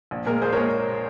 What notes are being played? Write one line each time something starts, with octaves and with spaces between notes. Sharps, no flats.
A#1
A#2 G#3 A#4
A#1 G#4 C5
A#4 C#5
A#2 G#3